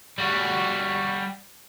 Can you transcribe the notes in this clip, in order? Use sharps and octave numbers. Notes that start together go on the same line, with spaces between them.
G3 F#4